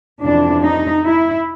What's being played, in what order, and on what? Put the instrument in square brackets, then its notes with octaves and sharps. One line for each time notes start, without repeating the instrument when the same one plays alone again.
[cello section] F2 C3 E3 D4
D#4
E4